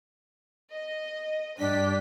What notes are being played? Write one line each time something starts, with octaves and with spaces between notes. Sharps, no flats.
D#5
G2 D4 G4 B6